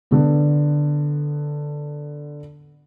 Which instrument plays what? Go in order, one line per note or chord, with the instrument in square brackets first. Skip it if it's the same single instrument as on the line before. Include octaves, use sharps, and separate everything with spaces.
[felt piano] D3 B3